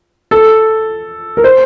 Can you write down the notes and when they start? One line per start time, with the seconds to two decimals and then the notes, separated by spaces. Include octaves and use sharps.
0.31 A4
1.37 A#4
1.44 C5